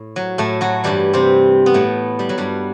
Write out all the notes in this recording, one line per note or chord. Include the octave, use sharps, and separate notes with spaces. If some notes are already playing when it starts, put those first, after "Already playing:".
Already playing: A2
F#3
A2 A3
F#3 F#4
G2 E3 G3 G4
C3 C4
B3
A2 A3
G3
F#3
G2 G3